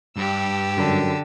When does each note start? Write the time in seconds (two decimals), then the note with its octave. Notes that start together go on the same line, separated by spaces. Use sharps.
0.16 G2 G4 E6
0.77 F#2 D3